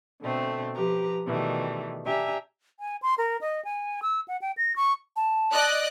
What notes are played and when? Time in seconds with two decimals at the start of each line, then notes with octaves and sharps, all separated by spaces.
0.22 B2 D3 A3 C4
0.76 F3 G4 B4 A#5
1.25 B2 D#3 E3 G3 A3
2.05 D4 G4 E5 G#5 A#5
2.80 G#5
3.02 C6
3.18 A#4
3.41 D#5
3.65 G#5
4.02 E6
4.28 F#5
4.42 G5
4.57 A#6
4.76 C#6
5.16 A5
5.52 D5 D#5 F#6